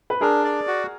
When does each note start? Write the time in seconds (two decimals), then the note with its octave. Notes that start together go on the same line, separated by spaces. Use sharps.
0.10 B4
0.21 D4 G#4 A#4
0.44 D5
0.67 F#4